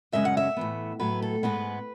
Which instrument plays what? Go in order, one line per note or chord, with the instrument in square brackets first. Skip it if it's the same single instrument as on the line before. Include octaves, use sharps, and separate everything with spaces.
[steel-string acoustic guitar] F#2 C#3 G#3 C#4 E5
F#5
E5
A2 E3 B3
A2 F#3 B3 B4
A4
G#2 G#3 B3 B4